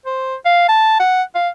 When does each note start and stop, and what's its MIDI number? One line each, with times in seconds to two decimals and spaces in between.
0.06 0.35 72
0.45 0.67 77
0.69 0.99 81
1.00 1.23 78
1.35 1.49 77